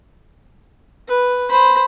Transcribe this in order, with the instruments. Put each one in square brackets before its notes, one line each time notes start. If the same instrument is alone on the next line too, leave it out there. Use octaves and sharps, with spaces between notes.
[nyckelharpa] B4
C5 B5